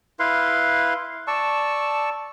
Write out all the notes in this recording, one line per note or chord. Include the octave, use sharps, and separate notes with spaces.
E4 B4 F5 C6
D5 A5 C#6 E6